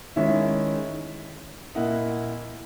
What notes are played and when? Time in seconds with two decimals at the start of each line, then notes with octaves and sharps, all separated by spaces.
0.16 D#3 G#3 C#4 E4 E5
1.75 A#2 A#3 E4 D#5 F#5